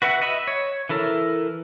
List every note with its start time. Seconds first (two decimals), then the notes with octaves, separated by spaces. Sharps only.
0.02 F#4 B4 E5 F#5
0.22 D#5 E5 B5
0.47 C#5
0.89 E3 E4 A4 A#4